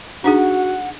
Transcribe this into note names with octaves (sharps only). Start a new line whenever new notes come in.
D4 D#4 F#4 G#4 F#5